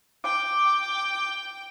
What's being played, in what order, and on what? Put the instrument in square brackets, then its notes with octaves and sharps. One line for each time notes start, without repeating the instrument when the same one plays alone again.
[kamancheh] G5 [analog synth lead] D6